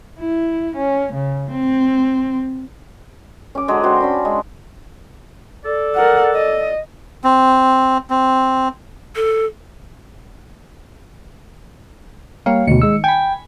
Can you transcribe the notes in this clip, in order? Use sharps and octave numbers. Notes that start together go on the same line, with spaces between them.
E4
C#4
C#3
C4
C#4 D6
D3 F#3 G#3
C4 F#4 C5 F5
C#4 D4 B5
G#3
A4 D5
A#4 F#5
D#5
C4
C4
A4
G3 A#3 C#5 F5
D2 B2 D#3 C#7
G#3 E6
G5 G#5 B5